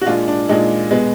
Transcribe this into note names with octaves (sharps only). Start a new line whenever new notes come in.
F#4
A#2 G#3 D4 F4
D4
A#2 G#3 D4 D#4
B2 G#3 B3